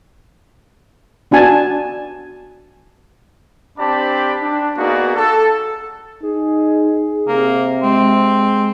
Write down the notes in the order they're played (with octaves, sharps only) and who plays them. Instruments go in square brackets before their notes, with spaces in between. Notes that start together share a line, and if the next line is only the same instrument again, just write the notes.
[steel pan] B3 D4 F#4 G#5 A5
[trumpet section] C4 D4 G4 D5 A5 B5
D4
A#3 B3 D#4 F#4 G#4 D5
A4
[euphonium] D#4 [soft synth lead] G#4
[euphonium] C3 [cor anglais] A#3
[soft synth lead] G#3 [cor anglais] C4